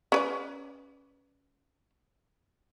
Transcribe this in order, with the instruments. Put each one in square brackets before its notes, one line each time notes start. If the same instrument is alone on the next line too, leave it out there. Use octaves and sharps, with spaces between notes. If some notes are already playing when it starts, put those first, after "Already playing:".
[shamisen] C#4 B4 D5